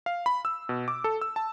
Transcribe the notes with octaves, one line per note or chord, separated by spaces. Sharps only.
F5
B5
E6
B2
D6
A4
E6
A5